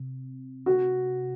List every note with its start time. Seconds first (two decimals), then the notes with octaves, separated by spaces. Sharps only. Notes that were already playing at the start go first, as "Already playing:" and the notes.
Already playing: C3
0.66 F#4